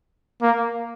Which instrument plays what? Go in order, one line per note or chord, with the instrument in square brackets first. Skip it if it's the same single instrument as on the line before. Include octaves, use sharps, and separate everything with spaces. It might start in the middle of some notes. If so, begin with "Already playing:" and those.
[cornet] A#3